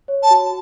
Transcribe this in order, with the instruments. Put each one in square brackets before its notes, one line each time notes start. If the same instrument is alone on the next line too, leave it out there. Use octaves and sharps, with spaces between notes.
[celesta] C#5
[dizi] A5
[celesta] F#4